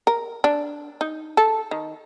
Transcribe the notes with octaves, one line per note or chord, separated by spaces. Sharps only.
A#4
D4
D#4
A4
D#3